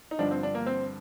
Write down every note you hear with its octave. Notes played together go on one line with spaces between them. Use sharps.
D#4
G2 D3 F3 D4
C4
D4
A#3
C4